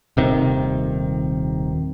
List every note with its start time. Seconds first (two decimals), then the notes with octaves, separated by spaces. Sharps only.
0.17 D#1 C3 D#3